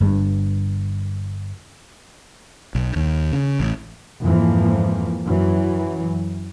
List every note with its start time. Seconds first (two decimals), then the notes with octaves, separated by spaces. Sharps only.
0.01 G1 G2
2.75 B1
2.96 D#2
3.33 C#3
3.60 A1
4.22 F2 G#2 E3 F3 A#3
5.26 F#2 E3 F#3